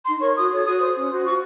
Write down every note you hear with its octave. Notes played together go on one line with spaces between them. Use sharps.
D#4 C6
A#4 C#5 C#6
F#4 D#6
A4 C#5
F#4 D#6
C5
C#4
F#4 C5
F4 C#6